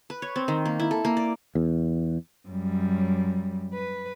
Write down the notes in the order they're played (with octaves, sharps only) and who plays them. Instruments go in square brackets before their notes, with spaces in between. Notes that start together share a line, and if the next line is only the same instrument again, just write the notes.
[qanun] B4
C#5
C4
D#3
A#3
E4
A4
A#3
D5
[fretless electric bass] E2
[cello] F#2 G3
B4